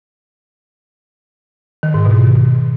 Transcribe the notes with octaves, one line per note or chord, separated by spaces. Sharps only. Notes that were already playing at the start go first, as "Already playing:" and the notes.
D#3
G#2
B2